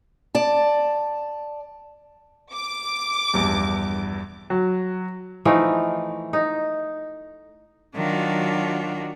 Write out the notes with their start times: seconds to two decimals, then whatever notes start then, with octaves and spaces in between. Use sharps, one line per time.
0.35 D5 A5
2.54 D6
3.34 A#1 E2 G2
4.50 F#3
5.45 E3 F3 A3 D#4
6.33 D#4
7.95 D#3 F#3 D4 F4 F#4